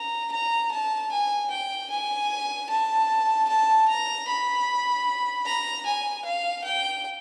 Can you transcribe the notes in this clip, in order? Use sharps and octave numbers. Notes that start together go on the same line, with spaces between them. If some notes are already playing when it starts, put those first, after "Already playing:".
Already playing: A#5
A#5
A5
G#5
G5
G#5
A5
A5
A#5
B5
A#5
G#5
F5
G5